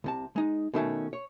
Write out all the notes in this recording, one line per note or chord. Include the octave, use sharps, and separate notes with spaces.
C2 C3 A5
G#3 D#4
B2 D#3 A3 C#4
C#5